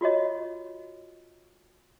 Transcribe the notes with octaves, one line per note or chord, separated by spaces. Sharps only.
F4 F#4 C#5 D#5